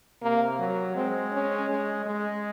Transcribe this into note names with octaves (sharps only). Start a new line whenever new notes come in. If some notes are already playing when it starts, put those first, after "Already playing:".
C3 A#3
F#3
G#3 C4
C#4
G#3
G#3